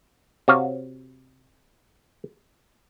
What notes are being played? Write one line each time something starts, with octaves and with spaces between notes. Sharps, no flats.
C3 F#4 C#5 F5